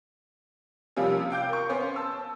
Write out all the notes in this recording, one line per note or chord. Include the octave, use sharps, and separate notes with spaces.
C3 F3 G3 A#3 C#4
F5 G5 D6 G6
A#4 C#6
B3 C#4 C5
A5 E6